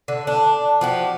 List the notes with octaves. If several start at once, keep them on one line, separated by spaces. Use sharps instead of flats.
D3
D4
F3 F#4 G4